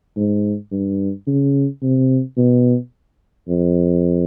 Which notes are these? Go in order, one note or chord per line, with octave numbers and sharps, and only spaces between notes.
G#2
G2
C#3
C3
B2
F2